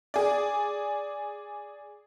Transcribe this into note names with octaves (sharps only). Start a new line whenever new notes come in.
G#4 D5